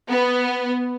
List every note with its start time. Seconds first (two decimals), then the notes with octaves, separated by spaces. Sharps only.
0.11 B3